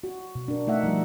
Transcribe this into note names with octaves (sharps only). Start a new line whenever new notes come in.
F#4
B2
D4 A#4
A3 D#4 E5 F#5
F3 G3